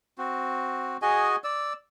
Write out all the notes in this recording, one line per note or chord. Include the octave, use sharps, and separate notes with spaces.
C4 F#4
F#4 G#4 D#5 G#5
D5 E6